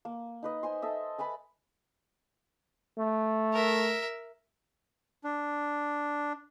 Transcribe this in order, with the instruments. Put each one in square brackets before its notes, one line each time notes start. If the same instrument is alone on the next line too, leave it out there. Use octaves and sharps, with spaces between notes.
[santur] A#3
D#4 B4 D#5
C5 G#5 C6
A4 D#5 E5
B4 G#5 A5 B5
[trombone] A3
[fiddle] A#4 E5
[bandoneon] D4